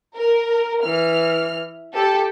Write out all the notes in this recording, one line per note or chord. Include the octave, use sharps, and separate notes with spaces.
A#4
E3 F6
G4 A4